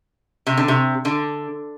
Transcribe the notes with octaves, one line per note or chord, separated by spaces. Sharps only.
C3
D3
C3
D3